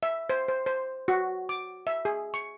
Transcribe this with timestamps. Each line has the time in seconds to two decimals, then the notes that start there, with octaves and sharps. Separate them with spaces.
0.03 E5
0.30 C5
0.48 C5
0.66 C5
1.08 F#4
1.49 D6
1.87 E5
2.05 G#4
2.34 C#6